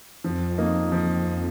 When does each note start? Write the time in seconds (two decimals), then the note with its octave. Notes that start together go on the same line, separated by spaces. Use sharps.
0.24 F2 F3
0.58 A#3 D#4
0.92 F3